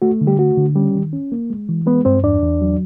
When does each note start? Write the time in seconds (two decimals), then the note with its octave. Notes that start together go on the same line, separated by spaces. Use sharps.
0.02 A3 F#4
0.21 D3
0.27 G3 G4
0.39 A3 F#4
0.58 D3
0.75 G3 C#4 G4
0.95 D#3
1.13 C#4
1.32 A#3
1.50 G#3
1.69 E3
1.86 G#3 B3 B4
2.05 G2 C4 C5
2.23 E2 D4 D5
2.42 E2
2.61 F#3